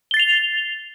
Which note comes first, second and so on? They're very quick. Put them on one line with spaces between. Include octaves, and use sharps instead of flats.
G7 A6 C7 F7